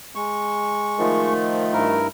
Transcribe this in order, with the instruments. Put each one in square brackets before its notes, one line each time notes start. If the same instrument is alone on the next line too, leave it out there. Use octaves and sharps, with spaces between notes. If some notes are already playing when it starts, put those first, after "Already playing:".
[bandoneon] G#3 C#6
[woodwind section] D#3 F3 A3
[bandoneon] G2 E4 A#4